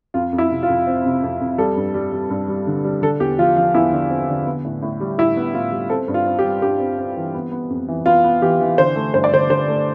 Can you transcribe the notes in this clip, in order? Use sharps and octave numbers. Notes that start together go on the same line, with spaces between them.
F2 F4
F2
E4
C3
F4
F2
C4
C3
F2
F2
G3 A4
G2
G3
G3
G2
G3
D3
G3
D3 A4
E2 G4
F3 F4
F3 F4
E2 E4
D3
C4
D3
B3
A2
A2
G3
A2 E4
B3
A2 F4
G3
C4 A4
G2
F4
C4
G4
G3
G2 G4
C4
C4
E3
B3
B3
F2
E3
B3 F4
B3
E3 G4
E3
D3 C5
A3
G2 C5
D5
D3 C5
D3 C5
A3